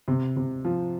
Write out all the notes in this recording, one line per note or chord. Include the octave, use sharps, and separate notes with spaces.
C3
C3
F3